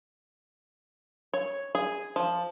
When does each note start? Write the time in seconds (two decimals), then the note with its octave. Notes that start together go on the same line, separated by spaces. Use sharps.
1.34 C#5
1.75 G#4
2.16 F3